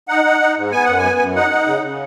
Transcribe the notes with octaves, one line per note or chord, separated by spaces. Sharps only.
D#4 F#5
D#4
D#4
G#2
B3 G#5
F#2 F#5
G#5
B3
F#2
D#4 F#5
D#4
C#3
C#3